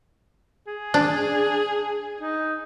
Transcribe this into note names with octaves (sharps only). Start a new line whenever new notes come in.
G#4
D4
D#4